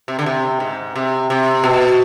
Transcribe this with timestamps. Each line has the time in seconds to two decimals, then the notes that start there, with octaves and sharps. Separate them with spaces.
0.08 C3
0.19 D3
0.26 C3
0.60 G#2
0.95 C3
1.30 C3
1.64 B2